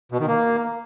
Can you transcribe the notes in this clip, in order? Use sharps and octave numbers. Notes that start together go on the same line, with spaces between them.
B2
D#3
A#3